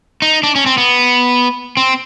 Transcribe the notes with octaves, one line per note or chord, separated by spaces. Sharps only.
D#4
D4
C#4
C4
B3
C4